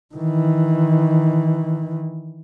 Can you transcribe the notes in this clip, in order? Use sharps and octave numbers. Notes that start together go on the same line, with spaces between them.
D#3 E3